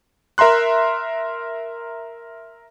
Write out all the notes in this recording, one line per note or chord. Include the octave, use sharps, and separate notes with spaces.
A#4 E5 A#5 C6 F#6